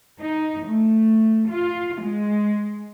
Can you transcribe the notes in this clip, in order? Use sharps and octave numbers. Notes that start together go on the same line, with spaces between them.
D#4
A3
F4
G#3